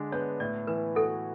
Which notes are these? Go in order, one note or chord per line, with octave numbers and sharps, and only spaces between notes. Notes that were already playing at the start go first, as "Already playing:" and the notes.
Already playing: D3 G#3 D4
B3 C#5
A2 D5
E3 B4
F#4 A4